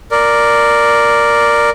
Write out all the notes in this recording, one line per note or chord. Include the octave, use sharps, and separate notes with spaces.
A#4 D5